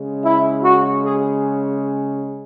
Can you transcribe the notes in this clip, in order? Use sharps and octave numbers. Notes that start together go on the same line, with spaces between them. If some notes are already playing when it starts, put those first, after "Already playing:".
Already playing: C#3 G#3
E4
F#4
G#4